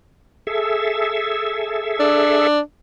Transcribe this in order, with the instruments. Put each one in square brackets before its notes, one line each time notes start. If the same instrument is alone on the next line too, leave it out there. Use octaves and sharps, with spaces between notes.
[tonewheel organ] G#4 A4 E5
[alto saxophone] D4